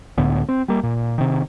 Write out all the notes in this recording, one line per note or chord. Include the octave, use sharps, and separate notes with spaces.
C#2 A2 D3 B3
C4
G3 A#3
A#2
C3 D#3